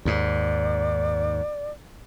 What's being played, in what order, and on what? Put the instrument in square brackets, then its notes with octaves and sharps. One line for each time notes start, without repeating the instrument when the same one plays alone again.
[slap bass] D#2 G#2 [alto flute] D5